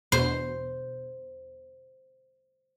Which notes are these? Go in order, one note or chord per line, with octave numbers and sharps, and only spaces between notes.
E2 B2 C5